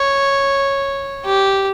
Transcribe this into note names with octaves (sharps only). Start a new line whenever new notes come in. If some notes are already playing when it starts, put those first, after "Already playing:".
Already playing: C#5
G4